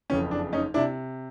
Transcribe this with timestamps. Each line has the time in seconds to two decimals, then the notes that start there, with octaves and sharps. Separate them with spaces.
0.10 F#1 F2 C#3 E3 C#4
0.31 D4
0.53 C#4 D#4
0.74 C3 D4 E4